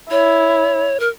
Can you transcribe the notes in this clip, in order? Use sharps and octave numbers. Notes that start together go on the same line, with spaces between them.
E4 C#5
A#4